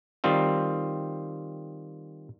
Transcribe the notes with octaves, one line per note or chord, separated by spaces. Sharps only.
D#3 G3 C4 F4